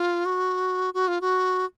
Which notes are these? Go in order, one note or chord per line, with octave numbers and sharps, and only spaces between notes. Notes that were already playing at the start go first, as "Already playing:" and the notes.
Already playing: F4
F#4
F#4
F4
F#4